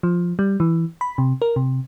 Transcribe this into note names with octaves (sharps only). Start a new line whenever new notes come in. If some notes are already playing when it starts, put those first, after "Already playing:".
F3
G3
E3
B5
C3
A#4
C3